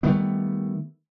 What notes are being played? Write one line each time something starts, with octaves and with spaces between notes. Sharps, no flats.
D#3 G3 A3 B3